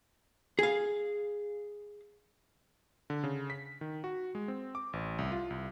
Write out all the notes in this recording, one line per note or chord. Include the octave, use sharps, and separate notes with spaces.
G#4 F5
D3
C#3
B6
D#3
F#4
G#3
C4
D6
A1
C2
F4
C2